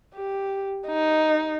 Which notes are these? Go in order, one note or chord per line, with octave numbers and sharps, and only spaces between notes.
G4
D#4